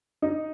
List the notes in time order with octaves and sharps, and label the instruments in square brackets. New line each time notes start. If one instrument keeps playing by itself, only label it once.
[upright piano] D#4